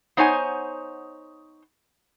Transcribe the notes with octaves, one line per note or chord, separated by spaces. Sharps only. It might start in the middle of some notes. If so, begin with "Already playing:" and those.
B3 D#4 C5 C#5 F#5 G#5